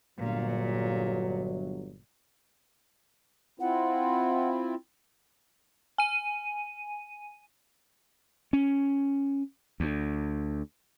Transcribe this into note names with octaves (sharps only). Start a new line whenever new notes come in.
G1 A#2 F#3
C4 E4 F4 F#5
G#5 D#7
C#4
D2